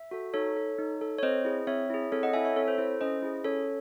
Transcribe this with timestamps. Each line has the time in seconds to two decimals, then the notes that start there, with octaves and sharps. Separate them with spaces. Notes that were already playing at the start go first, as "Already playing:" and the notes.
Already playing: E5
0.11 F#4 A4
0.34 D#4 A4 C#5
0.57 A4
0.79 D#4
1.01 A4
1.18 C#5
1.23 C4 C5 D#5
1.45 E4 G#4
1.67 C4 C#5 E5
1.90 E4 G#4
2.12 C4 A4 C#5
2.23 D#5 F#5
2.33 E4 A4 E5 G#5
2.45 C#5 E5
2.56 C4 A4 C#5
2.68 C5
2.78 E4 A4 C5
3.01 C#4 C5 D#5
3.22 E4 G#4
3.45 C#4 A4 C#5